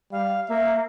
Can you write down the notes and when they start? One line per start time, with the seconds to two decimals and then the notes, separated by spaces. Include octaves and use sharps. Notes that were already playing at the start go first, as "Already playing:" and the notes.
0.12 G3 F5
0.49 A#3 E5